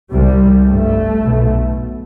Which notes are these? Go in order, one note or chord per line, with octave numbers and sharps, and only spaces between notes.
C2 C3 G3
G1 G2 A3
B1 B2